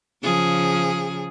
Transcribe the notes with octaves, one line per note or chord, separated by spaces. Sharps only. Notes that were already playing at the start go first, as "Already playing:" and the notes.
C#3 F3 G#4